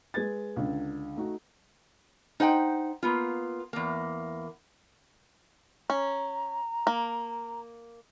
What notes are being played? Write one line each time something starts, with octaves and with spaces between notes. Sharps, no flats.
G#3 B4 G#6 A6
C#2 D3
A3 D#4 F#4
D#4 C5 F#5 G5
A#3 B3 F4
E2 A#3
C#4 A#5
A#3